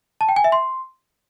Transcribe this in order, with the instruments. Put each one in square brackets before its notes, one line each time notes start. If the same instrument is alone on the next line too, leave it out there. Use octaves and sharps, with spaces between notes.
[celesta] A5
G5
G#5
E5
C6